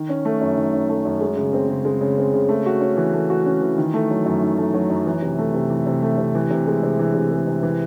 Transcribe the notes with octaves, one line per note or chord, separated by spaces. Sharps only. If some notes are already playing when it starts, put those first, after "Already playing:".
Already playing: D#3
C#4
A3
F#2
D#3
C#4
A3
F#2
G#3
C#3
C4
C#3
G#3
C#3
C4
C#3
A3
F#4
C#4
E3
A3
F#4
C#4
E3
D#3
A3
F#3
F#2
D#3
A3
F#3
F#2
E3
C3
A3
C3
E3
C3
A3
C3
E3
C3
G#3
C3
E3
C3
G#3
C3
E3